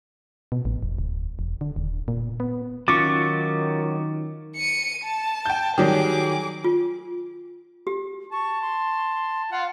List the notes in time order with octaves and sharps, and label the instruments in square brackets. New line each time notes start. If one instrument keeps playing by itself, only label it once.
[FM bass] B2
A1
E1
D1
E1
D3
D#1
A#2
B3
[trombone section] D#3 [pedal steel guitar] F#3 C#4 C#6 [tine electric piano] F4 A6 [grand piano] D6
[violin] C#7 D#7
A5
[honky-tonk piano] G5 G6
[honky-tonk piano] D#3 F#3 G3 [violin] G#4 D6
[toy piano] F4
G4
[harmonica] A5 [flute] C#6
[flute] C6
[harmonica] F4 F#5 [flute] F5